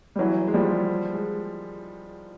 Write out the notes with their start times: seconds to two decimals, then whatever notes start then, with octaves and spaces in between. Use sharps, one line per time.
0.15 G3
0.19 E3 F#3
0.48 G#3
0.54 F3 G3
1.14 G#3